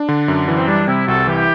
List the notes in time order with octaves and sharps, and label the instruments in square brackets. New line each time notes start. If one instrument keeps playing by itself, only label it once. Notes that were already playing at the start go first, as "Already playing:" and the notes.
Already playing: [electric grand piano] D4
D3
F#2
E3
[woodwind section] C4
[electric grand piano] G3 [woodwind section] D4
[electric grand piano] C3 [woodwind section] C4 E4
[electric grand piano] C2 [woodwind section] F#4 A4
[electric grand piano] E3 [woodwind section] E4 G4